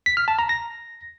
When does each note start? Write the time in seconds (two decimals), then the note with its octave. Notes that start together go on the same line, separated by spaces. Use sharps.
0.06 B6
0.17 F6
0.28 A5
0.39 A#5
0.49 A#6